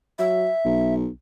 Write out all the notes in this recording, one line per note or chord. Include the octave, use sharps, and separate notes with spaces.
F#3 E5
B1